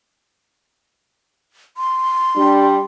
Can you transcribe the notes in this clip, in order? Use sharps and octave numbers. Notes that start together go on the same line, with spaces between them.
C6
G3 D4